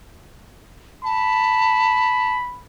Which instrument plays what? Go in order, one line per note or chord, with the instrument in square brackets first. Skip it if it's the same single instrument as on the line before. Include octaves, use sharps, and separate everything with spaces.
[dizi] A5 [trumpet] B5